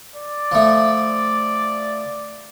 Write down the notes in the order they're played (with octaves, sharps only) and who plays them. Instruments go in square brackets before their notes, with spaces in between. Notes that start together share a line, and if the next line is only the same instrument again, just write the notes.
[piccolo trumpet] D5
[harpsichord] F3 A3